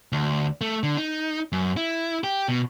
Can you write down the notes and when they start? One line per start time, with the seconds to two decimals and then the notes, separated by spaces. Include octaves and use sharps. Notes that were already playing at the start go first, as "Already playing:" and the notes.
0.12 D2
0.61 A3
0.83 D3
0.97 D#4
1.52 F#2
1.77 E4
2.24 G4
2.48 B2